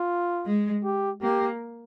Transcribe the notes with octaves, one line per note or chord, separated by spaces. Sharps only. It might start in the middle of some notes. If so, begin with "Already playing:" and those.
Already playing: F4
G#3
G4
A#3 G4